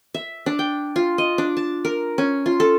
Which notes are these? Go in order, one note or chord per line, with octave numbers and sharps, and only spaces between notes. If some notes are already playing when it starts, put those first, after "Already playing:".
E5
D4
G5
F4
D#5
D4
A5
A#4
C#4
F4
A4